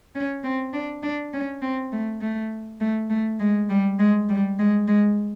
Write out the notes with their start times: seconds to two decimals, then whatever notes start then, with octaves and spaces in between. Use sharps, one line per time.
0.15 C#4
0.44 C4
0.73 D4
1.03 D4
1.33 C#4
1.62 C4
1.92 A3
2.21 A3
2.80 A3
3.10 A3
3.40 G#3
3.69 G3
3.99 G#3
4.29 G3
4.59 G#3
4.88 G#3